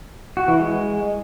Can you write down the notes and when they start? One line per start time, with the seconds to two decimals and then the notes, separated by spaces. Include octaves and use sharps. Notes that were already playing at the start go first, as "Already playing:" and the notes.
0.37 F#4
0.48 E3
0.59 G#3